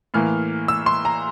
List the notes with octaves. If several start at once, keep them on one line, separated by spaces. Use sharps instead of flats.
A2 E3 A#3 F6
E6
C6
A#5